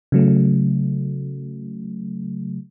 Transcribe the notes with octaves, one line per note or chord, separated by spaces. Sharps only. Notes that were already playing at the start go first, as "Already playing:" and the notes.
C#3 F#3 A3